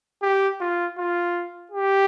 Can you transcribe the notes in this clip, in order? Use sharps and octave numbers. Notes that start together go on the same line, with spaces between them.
G4
F4
F4
G4